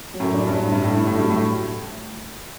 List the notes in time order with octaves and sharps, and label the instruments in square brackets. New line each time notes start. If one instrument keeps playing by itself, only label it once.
[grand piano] F#3
[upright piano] F#2 A2
[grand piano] D4
[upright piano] G2
[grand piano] A2
[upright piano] G2 [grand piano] E4
[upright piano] A2
[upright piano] G2 [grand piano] A3
[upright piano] A2
[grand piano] F#3
[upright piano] G2
A2